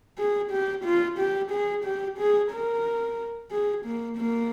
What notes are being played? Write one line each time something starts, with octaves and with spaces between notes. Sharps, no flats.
G#4
G4
F4
G4
G#4
G4
G#4
A#4
G#4
A#3
A#3